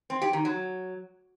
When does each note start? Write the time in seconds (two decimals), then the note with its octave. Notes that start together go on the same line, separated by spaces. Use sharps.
0.10 C4
0.22 G4
0.33 D#3
0.45 F#3